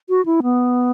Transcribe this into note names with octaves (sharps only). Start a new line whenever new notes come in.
F#4
E4
B3